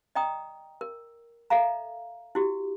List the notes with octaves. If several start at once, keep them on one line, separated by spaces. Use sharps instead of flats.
D5 D#5 G5 A#5 D#6
A#4
A4 D5 E5 F5 A#5
E4 F#4 G4